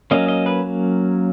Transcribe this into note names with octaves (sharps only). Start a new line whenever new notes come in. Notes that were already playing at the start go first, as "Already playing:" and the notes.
F#3 A#3 C#4 D#5
D#5
B4